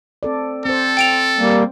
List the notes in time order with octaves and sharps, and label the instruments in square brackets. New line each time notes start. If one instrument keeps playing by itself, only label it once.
[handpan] C4 A4 D5
[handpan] C4 C5 [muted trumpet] A4
[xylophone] G5 D7 F7
[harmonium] G3 A#3